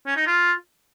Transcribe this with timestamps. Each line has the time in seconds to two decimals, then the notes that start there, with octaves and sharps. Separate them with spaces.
0.06 C#4
0.16 D#4
0.26 F4